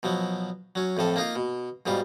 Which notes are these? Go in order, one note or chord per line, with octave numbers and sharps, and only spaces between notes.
B2 F3 F#3
F#3 C#4
F2 A2 F3 A4
A#3 D#4 F4
B2
G#2 B2 G3 F4